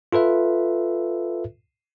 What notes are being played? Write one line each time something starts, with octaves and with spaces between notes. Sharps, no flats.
F4 A4 B4 E5